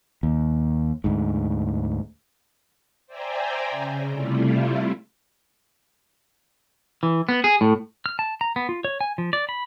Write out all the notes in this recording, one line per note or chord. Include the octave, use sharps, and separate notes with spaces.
D#2
D2 G#2
C5 D5 E5 G5 G#5 A#5
C#3
C3 G3 A3 E4 F4
E3
B3
G#4
A2
F6
A5
A#5
B3
F4
C#5
G#5
F3
D5
B5